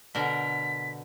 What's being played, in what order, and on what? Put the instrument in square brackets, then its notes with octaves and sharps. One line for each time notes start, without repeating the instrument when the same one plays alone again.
[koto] B2 D3 A#4 [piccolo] B6